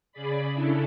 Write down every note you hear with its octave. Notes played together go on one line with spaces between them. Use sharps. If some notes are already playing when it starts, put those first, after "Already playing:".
C#3 G#4 D5 B5
C#3 C#4 D4 E4 A4